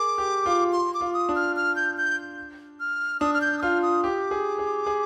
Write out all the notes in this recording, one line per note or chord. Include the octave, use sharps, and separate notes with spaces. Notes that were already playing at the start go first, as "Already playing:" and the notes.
Already playing: G#4 A#4 D6
G4
F4
C6
D6
F4
D#6
D4
F6
F6
G6
G6
F6
D4 D#6
F6
G6
D#6
F4 F6
D#6
G4 D6
G#4
G#4
G#4